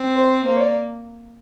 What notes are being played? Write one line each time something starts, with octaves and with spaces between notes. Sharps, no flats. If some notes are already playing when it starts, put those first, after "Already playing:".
Already playing: C4
C5
A#3 C5
C#5
D5